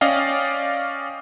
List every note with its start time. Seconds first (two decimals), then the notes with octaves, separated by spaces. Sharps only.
0.01 C#4 D5 D#5 F5 G5